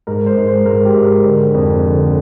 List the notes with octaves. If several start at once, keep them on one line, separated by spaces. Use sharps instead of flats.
G#2 A#4
C5
G#2
C5
G#2 A#4
G4
G#2
A#4
D3
F2
D3